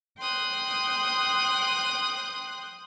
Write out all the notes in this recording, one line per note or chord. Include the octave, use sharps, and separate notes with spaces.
G5 C6 D#6 F#6